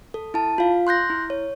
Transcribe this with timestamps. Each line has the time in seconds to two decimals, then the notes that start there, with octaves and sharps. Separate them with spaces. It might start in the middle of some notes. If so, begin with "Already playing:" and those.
0.14 A4
0.34 E4 A5
0.58 F4 F5
0.87 C6 F#6 G6 A#6
1.10 E4
1.30 C#5